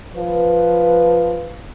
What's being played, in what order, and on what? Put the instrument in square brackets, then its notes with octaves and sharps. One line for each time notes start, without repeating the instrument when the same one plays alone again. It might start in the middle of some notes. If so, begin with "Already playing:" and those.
[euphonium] F3 [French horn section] B4